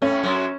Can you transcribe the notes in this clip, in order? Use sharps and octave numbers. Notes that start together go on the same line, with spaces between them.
A2 A3 C#4
F#2 F#3